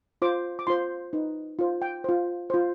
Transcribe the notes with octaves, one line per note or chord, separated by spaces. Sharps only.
F4 C5 D6
D6
F4 C5 C6
D#4 B4
F4 C5
G5
F4 C5
F4 C5